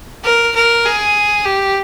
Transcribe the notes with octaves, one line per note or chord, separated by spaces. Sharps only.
A#4
A#4
G#4
G4